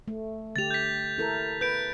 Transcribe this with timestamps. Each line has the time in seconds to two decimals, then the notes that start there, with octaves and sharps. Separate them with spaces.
0.08 A3
0.56 D3 A3 G4 A6 F7
0.71 G6 B6
1.18 E4 A4 A#4
1.61 B4 G6 D7